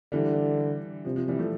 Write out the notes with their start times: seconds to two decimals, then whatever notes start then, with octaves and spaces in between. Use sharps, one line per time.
0.12 D3 E3 G3
1.05 C3 F3
1.16 F3
1.28 E3 G3
1.39 F3 A3